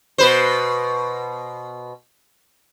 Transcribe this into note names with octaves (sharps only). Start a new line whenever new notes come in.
B2 B4 C5